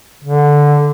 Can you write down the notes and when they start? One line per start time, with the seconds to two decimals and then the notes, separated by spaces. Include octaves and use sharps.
0.24 D3